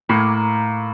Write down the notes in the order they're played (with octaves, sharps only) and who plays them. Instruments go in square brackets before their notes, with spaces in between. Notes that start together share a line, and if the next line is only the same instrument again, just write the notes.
[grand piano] A2 [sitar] A#3